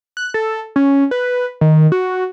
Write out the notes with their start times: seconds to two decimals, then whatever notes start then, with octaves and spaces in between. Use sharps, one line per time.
0.17 F#6
0.34 A4
0.76 C#4
1.11 B4
1.61 D#3
1.92 F#4